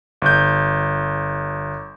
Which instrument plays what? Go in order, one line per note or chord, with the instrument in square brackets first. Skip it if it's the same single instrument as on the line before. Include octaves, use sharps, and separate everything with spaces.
[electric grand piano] G1 G6